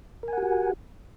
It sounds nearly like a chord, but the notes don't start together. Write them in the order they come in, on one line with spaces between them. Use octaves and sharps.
A#4 G#5 F#5 G4 F#4